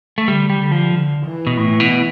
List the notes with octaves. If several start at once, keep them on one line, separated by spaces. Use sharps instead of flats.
A3
D3 G3
G3
D3
F3
D3
E3
B2
A2
B2